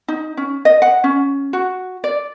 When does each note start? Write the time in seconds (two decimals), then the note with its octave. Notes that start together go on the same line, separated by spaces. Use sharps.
0.08 D#4
0.37 C#4
0.65 D#5
0.82 F#5
1.04 C#4
1.53 F#4
2.04 D5